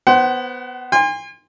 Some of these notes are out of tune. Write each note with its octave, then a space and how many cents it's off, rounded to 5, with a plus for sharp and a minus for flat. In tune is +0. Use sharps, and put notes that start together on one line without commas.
B3 +0 C5 +0 F#5 +35
G#5 -45 C6 +0